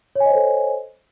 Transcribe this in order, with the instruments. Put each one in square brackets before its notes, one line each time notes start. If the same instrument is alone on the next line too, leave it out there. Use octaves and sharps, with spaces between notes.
[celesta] C#5
G#5
D#5
C5
A4